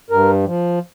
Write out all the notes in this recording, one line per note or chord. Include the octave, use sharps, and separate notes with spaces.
G2 A#4
F3